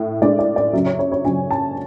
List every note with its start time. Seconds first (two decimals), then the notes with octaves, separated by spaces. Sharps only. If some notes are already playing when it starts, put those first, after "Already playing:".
Already playing: A2
0.21 A2 G#3 D4 D5
0.39 D5
0.56 D5
0.73 F#2 C#3 F#3 E5
0.86 C#5
0.99 C#5
1.12 C#5
1.25 F#2 C#3 F#3 G#5
1.51 A5